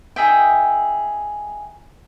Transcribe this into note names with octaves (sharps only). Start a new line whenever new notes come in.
D#4 G#4 E5 G5